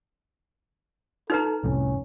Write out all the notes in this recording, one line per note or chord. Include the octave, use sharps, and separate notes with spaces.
D#4 A4 B4 A#5
C2 F2 A2 C#4